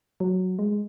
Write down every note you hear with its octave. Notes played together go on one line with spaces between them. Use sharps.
F#3
G#3